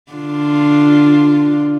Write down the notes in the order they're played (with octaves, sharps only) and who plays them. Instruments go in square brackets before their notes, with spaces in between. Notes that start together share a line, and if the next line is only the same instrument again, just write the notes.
[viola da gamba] D3 D4 F4